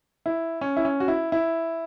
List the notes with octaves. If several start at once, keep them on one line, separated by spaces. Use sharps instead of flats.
E4
C#4
E4
C#4
F#4
E4
E4